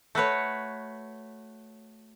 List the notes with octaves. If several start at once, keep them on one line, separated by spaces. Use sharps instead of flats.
A3 F#4 B4 C#5